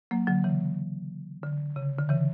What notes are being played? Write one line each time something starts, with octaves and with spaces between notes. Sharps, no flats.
F#3 A#3
D3 F#3
C#3 E3
D3
C#3
D3
C#3 E3